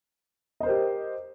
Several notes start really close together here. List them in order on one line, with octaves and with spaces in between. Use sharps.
D#5 C5 A#4 G4